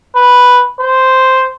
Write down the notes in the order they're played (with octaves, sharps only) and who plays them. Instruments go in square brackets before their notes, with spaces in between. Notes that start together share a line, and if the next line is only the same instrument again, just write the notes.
[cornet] B4
C5